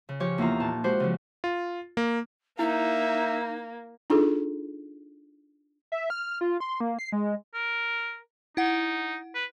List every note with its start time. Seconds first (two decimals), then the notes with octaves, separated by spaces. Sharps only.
0.09 C#3
0.20 F3 G4 C#5
0.38 E2 A#3 D#4 F4 A#5
0.60 A#2 A5
0.84 G#3 F#4 G4 C5
1.00 C#3 F3
1.44 F4
1.97 A#3
2.59 A#3 D#4 E4 E5
4.10 D4 D#4 F4 G#4 A4
5.92 E5
6.10 F6
6.41 F4
6.60 C6
6.80 A#3
6.99 C7
7.12 G#3
7.54 A#4
8.57 D#4 E4 F#5
9.35 B4